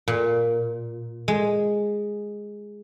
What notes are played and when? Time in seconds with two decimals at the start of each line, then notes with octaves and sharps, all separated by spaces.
0.08 A#2
1.28 G#3